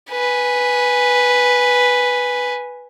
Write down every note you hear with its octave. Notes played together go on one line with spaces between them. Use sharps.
B4 G#5